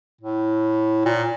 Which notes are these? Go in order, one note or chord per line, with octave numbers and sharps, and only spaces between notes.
A2
A#2